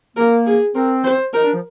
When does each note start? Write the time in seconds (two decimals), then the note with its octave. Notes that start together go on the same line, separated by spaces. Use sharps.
0.17 A#3 A#4
0.46 G#4
0.75 C4 A#4
1.04 C5
1.33 D#4 A#4
1.44 D4
1.54 F3